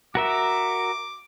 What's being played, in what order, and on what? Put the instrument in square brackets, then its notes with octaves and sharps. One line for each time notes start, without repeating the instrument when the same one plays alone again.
[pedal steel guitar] F#4 A#4 E5 [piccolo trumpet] D6